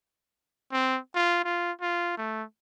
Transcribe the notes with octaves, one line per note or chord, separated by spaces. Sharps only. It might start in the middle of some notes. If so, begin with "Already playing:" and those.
C4
F4
F4
F4
A3